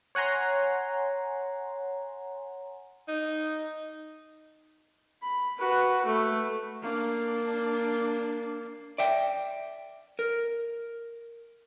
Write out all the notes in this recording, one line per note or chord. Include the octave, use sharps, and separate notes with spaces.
C#5 F#5 G#5 A#5 C6
D#4
B5
F#4 B4
A3
A#3 D4
D5 E5 G5
A#4